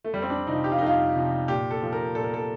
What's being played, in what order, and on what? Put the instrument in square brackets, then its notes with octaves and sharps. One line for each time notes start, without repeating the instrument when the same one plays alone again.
[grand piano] A3
F2 G3
C4
D4
C3 F3 D#4
G4
F4
F2 D#4
F4
C3 F3
A#2 G4
A4
F3
A#4
A#2 A4
A#4
A4